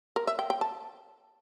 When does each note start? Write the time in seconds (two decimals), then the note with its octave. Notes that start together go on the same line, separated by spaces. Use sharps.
0.16 A#4
0.27 E5
0.39 G5
0.50 G5
0.61 A5